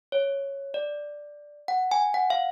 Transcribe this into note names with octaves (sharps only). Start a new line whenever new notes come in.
C#5
D5
F#5
G#5
F#5
F5